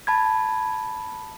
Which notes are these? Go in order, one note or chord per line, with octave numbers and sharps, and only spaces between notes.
A5 B5 G#6